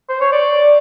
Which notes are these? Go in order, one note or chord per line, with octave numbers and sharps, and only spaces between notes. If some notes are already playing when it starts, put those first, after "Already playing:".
C5
C#5
D5